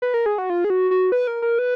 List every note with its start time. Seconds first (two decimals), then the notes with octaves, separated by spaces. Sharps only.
0.02 B4
0.14 A#4
0.26 G#4
0.38 F#4
0.50 F4
0.64 G#4
0.70 F#4
0.91 F#4
1.12 B4
1.27 A#4
1.42 A#4
1.59 B4